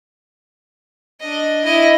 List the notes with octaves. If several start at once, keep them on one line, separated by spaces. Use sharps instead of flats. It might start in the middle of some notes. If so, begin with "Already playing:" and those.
D4 D#5
E4 D#5